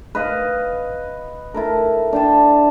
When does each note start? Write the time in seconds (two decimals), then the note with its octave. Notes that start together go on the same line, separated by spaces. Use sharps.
0.15 B4 D#5 F5
1.54 E4 A4 A#4
2.13 D4 G5 A5